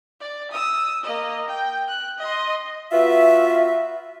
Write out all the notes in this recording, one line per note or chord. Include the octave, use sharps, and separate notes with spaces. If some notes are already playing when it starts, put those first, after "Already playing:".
D5
D#6 E6
A#3 D#5
G5
F#6
D#5 C6
B3 F4 F#4 B4 E5